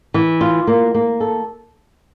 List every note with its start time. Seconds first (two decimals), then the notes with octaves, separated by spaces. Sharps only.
0.14 E3
0.41 F4
0.67 A#3
0.95 A#3
1.20 A4